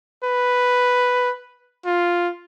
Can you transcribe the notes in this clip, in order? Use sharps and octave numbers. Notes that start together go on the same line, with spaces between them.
B4
F4